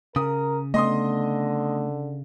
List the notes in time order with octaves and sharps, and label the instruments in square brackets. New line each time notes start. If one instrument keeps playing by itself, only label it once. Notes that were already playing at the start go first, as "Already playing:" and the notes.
[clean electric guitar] C#3 [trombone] A#4 [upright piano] D#6
[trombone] D3 [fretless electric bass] A3 B3 [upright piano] D#5 C6 D#6